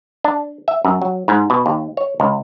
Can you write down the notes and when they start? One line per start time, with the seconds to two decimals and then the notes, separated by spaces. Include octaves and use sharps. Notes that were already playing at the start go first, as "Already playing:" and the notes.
0.24 D4
0.68 E5
0.85 F#2
1.02 F#3
1.28 G#2
1.50 B2
1.66 D#2
1.97 C#5
2.20 C#2